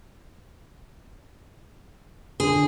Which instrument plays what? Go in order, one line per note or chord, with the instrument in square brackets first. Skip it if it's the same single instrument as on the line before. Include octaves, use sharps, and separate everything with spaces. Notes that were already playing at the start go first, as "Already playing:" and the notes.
[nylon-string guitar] D3 [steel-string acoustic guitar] G#4